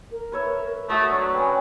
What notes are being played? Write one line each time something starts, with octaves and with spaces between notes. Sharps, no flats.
A#4
B4 C#5 E5
A3 F#4 C#6 D#6
F#3 D4
C#4 B4 G5